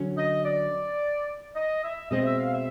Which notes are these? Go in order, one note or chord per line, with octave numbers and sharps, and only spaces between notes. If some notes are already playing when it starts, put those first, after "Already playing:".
Already playing: D3 F#3 C#4
D#5
D5
D#5
E5
B2 G#3 C4 D#5
E5
F5
E5